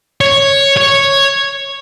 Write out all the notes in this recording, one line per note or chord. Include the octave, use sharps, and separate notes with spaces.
C#5
C#5